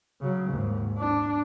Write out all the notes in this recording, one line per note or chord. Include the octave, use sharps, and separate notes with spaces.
C#3 F#3
D#2 G#2
D4